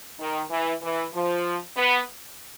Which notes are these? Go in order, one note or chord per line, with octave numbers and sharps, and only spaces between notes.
D#3
E3
E3
F3
B3